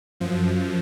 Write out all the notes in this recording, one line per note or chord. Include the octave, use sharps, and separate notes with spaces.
F#2 F3